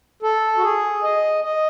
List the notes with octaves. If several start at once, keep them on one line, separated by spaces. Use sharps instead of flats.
A4
F#4
G#4
D#5
D#5